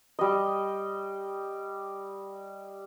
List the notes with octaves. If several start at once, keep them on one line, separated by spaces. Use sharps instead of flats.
G3 D#5